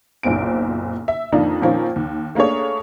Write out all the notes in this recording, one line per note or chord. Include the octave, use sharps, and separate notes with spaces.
F#1 B1 A#2 C4 D7
E5
F2 D#3 A#3 D4 D#4
A#2 D#3 F3 A#3 C4 C#4
D#2
A3 A#3 D4 G#4 C#5